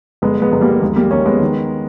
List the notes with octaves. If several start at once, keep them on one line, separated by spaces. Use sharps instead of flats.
G1 G#3 B3
G#3 B3
G1
G3 A#3
D#2 G#3
G3 A#3
D#2 A#3 C#4
G#3 B3
D#3